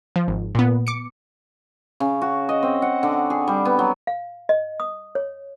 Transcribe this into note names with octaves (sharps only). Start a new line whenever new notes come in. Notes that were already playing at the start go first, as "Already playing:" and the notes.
F3
G#1
A#2 B3
D6 C#7
C#3
F#4
D#5
C4
F#5
D3
G#4
G3
B3
F#3
F5
D#5
D#6
C#5